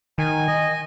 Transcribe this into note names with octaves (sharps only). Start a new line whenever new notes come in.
D#3 G#5
D#5